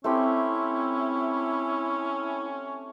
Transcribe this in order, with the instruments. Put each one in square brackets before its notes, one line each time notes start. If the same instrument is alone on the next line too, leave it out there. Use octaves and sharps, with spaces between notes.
[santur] A3 C4 G4 [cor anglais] C#4 [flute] E4